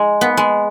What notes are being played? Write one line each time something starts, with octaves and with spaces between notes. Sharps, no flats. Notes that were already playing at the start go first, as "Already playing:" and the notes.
Already playing: G#3
B3
G#3